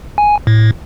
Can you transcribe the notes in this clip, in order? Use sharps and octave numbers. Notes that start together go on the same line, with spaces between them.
G#5
A2